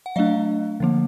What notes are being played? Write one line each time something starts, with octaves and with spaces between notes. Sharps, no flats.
F#5
F#3 A3 D4 D#5 F5
D3 F3 A#3